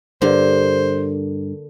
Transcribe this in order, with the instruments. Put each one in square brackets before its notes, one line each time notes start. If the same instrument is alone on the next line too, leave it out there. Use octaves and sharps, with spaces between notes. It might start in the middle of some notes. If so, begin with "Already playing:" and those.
[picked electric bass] G2 [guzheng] D3 A#3 [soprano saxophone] C5